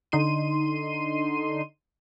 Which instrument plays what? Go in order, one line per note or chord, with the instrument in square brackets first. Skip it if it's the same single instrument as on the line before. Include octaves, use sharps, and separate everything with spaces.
[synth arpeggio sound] D3 D#4 C6 D#7